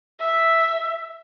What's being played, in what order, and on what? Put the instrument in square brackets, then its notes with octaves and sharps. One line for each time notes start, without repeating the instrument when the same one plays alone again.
[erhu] E5